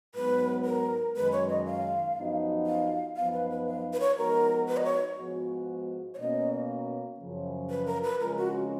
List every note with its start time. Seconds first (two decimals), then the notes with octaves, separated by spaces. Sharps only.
0.15 G#2 F#3 B3 B4
0.65 A#4
1.16 F#2 D#3 G#3 B4
1.32 C#5
1.49 D#5
1.66 F5
2.16 F#2 F3 B3 D#4 F#4
2.67 F5
3.16 F#2 F3 B3 D#4 F5
3.34 B4
3.50 B4
3.67 F5
3.93 B4
4.00 C#5
4.17 F3 G#3 B3 D#4 F#4 A#4
4.68 B4
4.77 D#5
4.85 C#5
5.18 G#2 F3 G#3 B3 F#4
6.14 C#5
6.19 B2 A#3 C#4 D#5
7.20 F#2 C#3 F3
7.70 B4
7.86 A#4
8.03 B4
8.20 F2 C#3 G#3 C#4 F4 A#4
8.38 F#4